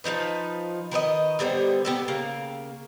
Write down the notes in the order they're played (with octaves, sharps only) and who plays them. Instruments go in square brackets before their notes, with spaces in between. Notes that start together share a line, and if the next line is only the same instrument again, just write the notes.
[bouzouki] F3 F#3 D#4 B4
D#3 B4 C#5 D#5
D3 G3 B3 C5
B3 G4 A4
C#3 A#3